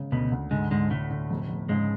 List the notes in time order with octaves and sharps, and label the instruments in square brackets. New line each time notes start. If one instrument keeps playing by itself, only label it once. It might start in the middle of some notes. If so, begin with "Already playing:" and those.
Already playing: [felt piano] G#1 C#3 G#3
[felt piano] D2 [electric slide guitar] B2 B3
[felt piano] D2
[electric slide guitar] G#2 G#3 [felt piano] D3
[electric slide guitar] G#2 G#3 [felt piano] D3
[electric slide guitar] A2 A3 [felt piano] D3
[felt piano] D3
F1
F1
[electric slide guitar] G#2 G#3 [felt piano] C#3